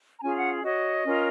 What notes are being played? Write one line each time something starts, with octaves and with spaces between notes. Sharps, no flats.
A#5
C#4 F4 G#4 G#5
F#5
F#4 C#5 D#5
C#4 F4 A#4